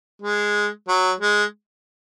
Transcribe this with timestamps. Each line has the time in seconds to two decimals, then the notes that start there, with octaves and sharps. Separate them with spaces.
0.22 G#3
0.88 F#3
1.20 G#3